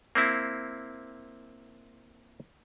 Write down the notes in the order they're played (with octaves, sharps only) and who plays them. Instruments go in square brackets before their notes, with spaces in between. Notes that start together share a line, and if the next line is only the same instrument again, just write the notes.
[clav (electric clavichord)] A#3 C4 E4